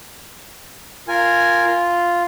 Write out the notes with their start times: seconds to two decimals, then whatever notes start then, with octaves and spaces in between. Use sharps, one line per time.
1.08 F4 A#4 G#5
1.66 F4